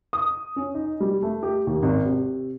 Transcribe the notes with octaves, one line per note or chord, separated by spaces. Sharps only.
D#6
C#4
D#4
G3
A3
G4
D#2
G#1
C3